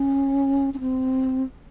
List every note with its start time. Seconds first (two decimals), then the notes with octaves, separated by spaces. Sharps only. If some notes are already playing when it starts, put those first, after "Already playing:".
Already playing: C#4
0.74 C#4
0.80 C4